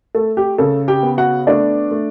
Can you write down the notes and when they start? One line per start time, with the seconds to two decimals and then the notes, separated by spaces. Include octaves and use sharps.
0.15 A3 A4
0.37 G4
0.58 C#3 A4
0.88 G4 G5
1.03 B3
1.17 F#4 F#5
1.47 A3 D4 D5
1.91 A3